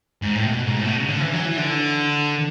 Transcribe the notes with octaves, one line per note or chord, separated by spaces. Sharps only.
G#2
A2
B2
G#2
A2
B2
C#3
D3
E3
F#3
E3
D3